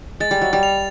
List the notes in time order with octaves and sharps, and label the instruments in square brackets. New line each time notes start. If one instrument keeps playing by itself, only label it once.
[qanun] G#3 [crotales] A6
[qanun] G3
F#3
G3
[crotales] F7